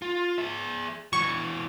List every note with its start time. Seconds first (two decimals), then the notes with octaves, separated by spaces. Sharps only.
0.02 F4
0.38 G#4 E5
1.13 E3 F#4 C#6